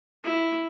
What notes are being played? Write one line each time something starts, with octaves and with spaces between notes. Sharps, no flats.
E4